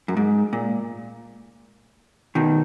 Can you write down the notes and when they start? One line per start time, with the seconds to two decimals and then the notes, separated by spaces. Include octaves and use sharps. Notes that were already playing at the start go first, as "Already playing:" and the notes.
0.08 F#2
0.17 G#2
0.53 A#2
2.35 B2 D#3